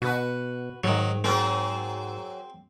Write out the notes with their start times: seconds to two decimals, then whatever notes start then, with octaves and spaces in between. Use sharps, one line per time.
0.02 B2 F#4 B4
0.84 G#2 D#3 F#3
1.24 F#3 C4 G#4 A#4